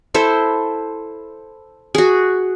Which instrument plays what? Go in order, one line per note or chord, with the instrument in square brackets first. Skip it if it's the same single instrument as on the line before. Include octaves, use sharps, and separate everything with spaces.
[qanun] E4 A4 C5
F#4 G#4